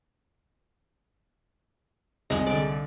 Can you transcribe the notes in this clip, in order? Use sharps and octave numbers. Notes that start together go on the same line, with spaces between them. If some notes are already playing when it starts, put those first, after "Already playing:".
C2 G#3 D#4 A#5
D3 D5